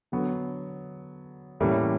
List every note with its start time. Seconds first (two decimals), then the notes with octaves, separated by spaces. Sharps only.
0.12 D3 F#3 B3
1.60 A2 E3 G3 A#3 C#4